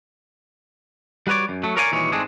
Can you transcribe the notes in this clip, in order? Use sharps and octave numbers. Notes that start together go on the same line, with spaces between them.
G3 F#4 B4 C#5 D5
F#2
F#3 A3
A#4 C#5 D5 F5 G#5
D#2 A#2 E3 G3 G#3 C#5
G#2 G#3 A3 C4 D4 G#4